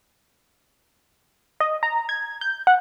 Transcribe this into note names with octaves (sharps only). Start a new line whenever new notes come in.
D#5
A#5
G#6
G6
F#5